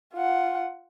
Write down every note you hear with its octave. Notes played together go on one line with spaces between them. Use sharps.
F4 F#5